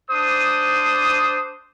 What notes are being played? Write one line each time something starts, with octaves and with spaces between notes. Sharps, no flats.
D4 C5 D#6